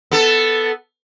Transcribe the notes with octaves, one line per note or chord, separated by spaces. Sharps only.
B3 A4